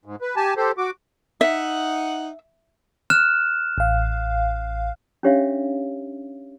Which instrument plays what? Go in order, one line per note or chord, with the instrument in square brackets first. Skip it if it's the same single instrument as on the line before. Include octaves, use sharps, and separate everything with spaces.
[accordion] G#2
B4
G4 G#5 A5
G4 A4 C5
F#4 D6
[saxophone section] D#4 F#5 [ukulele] E5
[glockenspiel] F6 F#6 E7
[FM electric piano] A1 F5
[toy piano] C#4 D4 G4 C#5 E5 F5